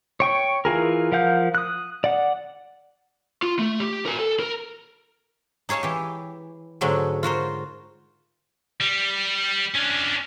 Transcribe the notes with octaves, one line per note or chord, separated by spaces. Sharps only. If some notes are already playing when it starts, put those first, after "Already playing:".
C#5 G5 C#6
E3 F4 G#4 A#4
F3 A#4 F5 F#5 G6
D#6 F#6
D5 F#5
F4
A3
G4
A#4 G#5
A4
A#4
D#4 G#4 C#5 F5 A5
E3 G4
G#2 D3 F#3 G#3 A3
F4 F#4 A#4 C5
G3
C#4 D4